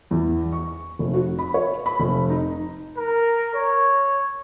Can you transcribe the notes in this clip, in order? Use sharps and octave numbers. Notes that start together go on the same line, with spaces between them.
E2
C#6
F1
F#4
B5
C#5
B5
F1
D#4
A#4
C#5